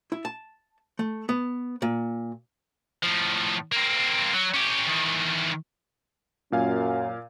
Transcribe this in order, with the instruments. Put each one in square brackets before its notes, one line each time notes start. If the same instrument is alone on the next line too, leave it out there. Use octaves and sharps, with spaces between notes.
[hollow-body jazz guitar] E4
A5
A3
B3
A#2
[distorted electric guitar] A2 F3
A#3 C4
F#3
C#4 G4
E2 D#3
[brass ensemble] F#2 [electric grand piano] A#2 F5 G#5